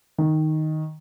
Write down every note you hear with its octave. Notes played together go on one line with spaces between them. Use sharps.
D#3